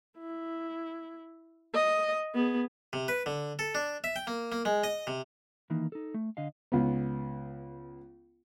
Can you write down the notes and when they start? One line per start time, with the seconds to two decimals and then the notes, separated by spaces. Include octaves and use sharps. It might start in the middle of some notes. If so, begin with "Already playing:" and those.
0.19 E4
1.74 D#5
2.35 B3 G#4
2.93 C3
3.08 B4
3.26 D3
3.59 A4
3.75 D4
4.04 E5
4.16 G5
4.27 A#3
4.52 A#3
4.65 G#3
4.84 D#5
5.07 C3
5.70 D#3 E3 A#3 D#4
5.92 D#4 A4
6.14 A3
6.37 D3 D#5 F5
6.72 C#2 B3